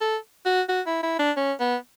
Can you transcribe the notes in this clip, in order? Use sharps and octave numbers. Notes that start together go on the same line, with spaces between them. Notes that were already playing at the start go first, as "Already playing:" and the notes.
A4
F#4
F#4
E4
E4
D4
C#4
B3